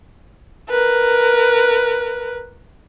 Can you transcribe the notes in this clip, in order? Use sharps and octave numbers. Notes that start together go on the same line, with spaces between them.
A#4 B4